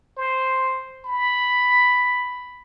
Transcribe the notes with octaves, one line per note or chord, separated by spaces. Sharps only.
C5
B5